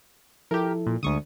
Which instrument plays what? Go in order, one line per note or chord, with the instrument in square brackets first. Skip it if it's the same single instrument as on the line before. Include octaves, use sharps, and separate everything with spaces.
[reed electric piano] F3 E4 A4 [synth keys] G4 A#4
[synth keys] A#2
[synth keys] D2 C#6 D#6 [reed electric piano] D3 G#3